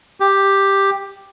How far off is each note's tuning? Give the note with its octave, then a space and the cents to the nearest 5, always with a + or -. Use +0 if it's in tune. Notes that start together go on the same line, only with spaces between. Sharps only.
G4 +5